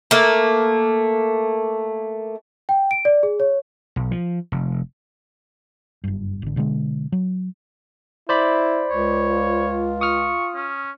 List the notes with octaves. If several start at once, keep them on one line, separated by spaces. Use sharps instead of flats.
A3 A#3
G5
D7
D5
G#4
C#5
B1
F3
F1
F#1 G2
G#1 D3
B2 D3 E3 G#3
F#3
E4 C5 D5 B5
C#2 C#5
F4
C#6 D#6 F6
C#4